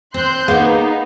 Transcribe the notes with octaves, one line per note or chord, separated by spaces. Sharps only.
C4 C6 F#6 G6
A#3 B3 D#4 G#4 F5 F#5